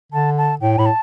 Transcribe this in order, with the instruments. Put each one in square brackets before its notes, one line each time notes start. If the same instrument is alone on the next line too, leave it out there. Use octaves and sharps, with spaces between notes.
[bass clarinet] D3 [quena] A5
[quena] A5
[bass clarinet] A2 [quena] G5
[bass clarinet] A2 [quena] B5
[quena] A5